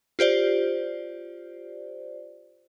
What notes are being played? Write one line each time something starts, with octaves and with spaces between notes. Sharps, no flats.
F4 G4 C5 D5